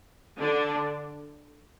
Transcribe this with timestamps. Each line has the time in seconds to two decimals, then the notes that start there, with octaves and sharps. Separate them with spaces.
0.40 D3 D4